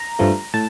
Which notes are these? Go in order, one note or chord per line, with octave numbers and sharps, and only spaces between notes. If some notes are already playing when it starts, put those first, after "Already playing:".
Already playing: A#5
G2 F3 A3
A2 A5